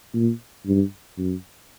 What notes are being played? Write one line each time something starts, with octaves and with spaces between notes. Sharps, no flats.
A#2
G2
F#2